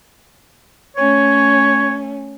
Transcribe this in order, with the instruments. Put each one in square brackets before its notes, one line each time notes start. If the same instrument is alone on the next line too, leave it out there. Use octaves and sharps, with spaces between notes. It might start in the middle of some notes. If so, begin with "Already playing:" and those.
[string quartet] A3 C#4 [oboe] C#5